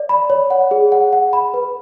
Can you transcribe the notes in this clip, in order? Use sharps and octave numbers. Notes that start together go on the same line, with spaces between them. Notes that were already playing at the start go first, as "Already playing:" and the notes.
Already playing: D5
B5
C#5
F#5
G#4
F#5
F#5
B5
B4